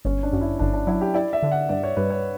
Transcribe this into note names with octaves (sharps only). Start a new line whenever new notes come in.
G1 C#4
D4
F#2
E4
G1 D4
D4
F#3 E4
G4
E4 D5
E5
D3
F#5
G2 D5
C#5
G2 B4
C#5